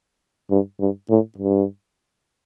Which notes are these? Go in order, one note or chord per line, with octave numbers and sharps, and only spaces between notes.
G2
G2
A2
G2